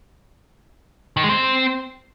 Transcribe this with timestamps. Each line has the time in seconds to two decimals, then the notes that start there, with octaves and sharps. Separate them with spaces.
1.17 D#3
1.23 G#3
1.29 C4